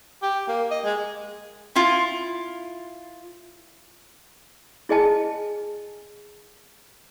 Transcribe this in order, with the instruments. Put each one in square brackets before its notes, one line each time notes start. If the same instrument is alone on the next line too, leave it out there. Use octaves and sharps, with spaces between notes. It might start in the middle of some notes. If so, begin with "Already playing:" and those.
[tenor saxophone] G4
A#3
D#5
G#3
[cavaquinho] E4 F4
[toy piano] E4 G#4 D#5 G#5 A5